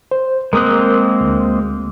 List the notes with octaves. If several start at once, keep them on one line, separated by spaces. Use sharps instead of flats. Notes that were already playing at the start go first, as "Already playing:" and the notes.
C5
G#3 A#3 C4 A#4 D#6 F#6
D2